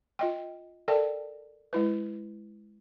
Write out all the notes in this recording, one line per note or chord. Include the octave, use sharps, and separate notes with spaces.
F4 D#5 G5
A4 A#4 D5 E5 G5 A5
G#3 E4 B4